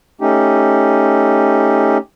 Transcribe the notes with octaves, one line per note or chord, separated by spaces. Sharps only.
A3 C#4 D#4 G4